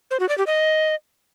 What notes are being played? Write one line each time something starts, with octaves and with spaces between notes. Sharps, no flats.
C5
F#4
D5
G4
D#5